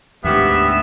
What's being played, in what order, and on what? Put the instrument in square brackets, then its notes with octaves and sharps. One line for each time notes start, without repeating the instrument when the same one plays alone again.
[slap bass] D2 G#2 [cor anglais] B3 [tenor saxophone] G4 [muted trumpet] E5